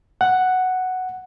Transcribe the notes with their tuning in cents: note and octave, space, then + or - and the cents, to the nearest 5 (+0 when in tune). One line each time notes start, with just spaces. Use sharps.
F#5 +0